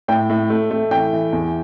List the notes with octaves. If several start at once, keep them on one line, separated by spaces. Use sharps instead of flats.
A2 G5
A2
A3
A3
E3 G5
E3
E2